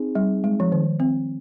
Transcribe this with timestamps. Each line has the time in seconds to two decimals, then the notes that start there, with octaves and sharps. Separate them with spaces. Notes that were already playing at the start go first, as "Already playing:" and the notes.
Already playing: C4 D#4 G#4
0.15 G3
0.44 G#3
0.60 F3
0.72 D#3
1.00 C4